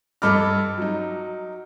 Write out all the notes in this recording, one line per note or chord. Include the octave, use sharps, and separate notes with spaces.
G2 A4 D#5 B5 D6 F6
F#3 D#4